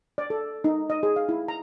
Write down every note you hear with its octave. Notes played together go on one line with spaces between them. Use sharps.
D5
A4
D#4
D#5
G#4
F5
E4
A#5